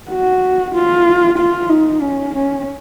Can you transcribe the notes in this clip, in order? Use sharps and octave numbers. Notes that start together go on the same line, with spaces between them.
F#4
F4
F4
D#4
C#4
C#4